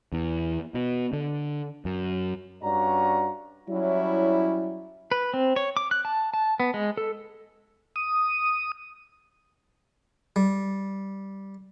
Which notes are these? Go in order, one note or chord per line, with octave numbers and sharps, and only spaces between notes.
E2
B2
D3
F#2
G2 C#4 F#4 D5 A#5
F#3 G3 C#4 E4
B4
C4
C#5
D6
F#6
A5
A5
B3
G#3
A4
D#6
G3